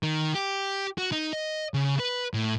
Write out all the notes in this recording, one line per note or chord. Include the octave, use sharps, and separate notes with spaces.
D#3
G4
F#4
D#4
D#5
C#3
B4
A2